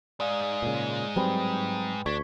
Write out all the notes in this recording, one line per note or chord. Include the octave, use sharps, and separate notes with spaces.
G#2 G#3 D5 F5
A#2 C#3
F#3 G3 C4 B4 G5 B5
D2 D4 C#6 G#6 B6